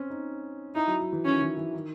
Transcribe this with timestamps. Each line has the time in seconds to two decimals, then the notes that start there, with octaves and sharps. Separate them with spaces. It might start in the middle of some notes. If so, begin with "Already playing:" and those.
Already playing: C4 C#4
0.10 D#4
0.75 D#4 E4
0.87 F#3
1.00 F#3
1.13 E3
1.25 D#3 C#4
1.42 E3
1.57 E3
1.74 D#3